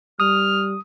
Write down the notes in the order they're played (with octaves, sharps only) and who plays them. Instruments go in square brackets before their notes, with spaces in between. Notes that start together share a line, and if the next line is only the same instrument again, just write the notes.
[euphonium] G3 [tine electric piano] D#6 [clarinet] F6